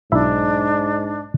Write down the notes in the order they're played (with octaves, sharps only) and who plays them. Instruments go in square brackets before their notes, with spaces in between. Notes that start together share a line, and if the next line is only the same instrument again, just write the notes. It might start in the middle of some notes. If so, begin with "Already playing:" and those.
[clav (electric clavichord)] B1 E4 E5 [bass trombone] G#2 [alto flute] D4